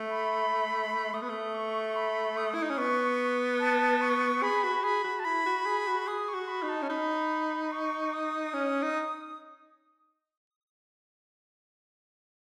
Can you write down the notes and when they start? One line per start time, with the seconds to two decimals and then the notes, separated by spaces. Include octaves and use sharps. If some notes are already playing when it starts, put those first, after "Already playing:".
Already playing: A3
0.11 B5
1.13 A3 D#6
1.22 B3
1.29 A3
1.55 C#6
1.96 B5
2.37 D#6
2.54 E4
2.63 D#4
2.70 C#4
2.78 B3 C#6
3.60 A5
4.01 C#6
4.43 G#4 B5
4.63 F#4
4.84 G#4 B5
5.04 F#4
5.20 A5
5.25 E4 B5
5.46 F#4
5.66 G#4
5.87 F#4
6.07 G#4 D#6
6.29 C#6
6.34 F#4
6.48 B5
6.63 D#4
6.69 A5
6.82 C#4
6.89 D#4 B5
7.72 C#6
8.13 D#6
8.54 C#4
8.82 D#4